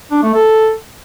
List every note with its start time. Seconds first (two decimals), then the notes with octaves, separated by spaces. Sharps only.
0.11 D4
0.23 A3
0.34 A4